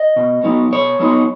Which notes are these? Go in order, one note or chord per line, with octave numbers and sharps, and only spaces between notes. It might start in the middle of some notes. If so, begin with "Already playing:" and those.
Already playing: D#5
B2
F#3 B3 D#4
B2 C#5
F#3 B3 D#4